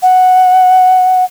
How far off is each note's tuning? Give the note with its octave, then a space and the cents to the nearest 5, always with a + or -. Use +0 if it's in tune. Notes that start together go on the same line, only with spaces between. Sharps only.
F#5 +0